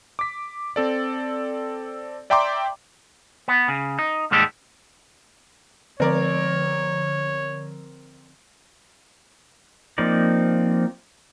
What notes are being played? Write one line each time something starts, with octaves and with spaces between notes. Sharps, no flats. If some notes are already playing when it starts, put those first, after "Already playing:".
D6 B6
C4 A4 D5
D5 E5 G5 A#5 C6 D6
B3
C#3
D#4
D#2 G#2 G3 G#3 G4 A4
D3 F3 C4 A#4 C#5 D5
F3 A#3 C4 D#4 D5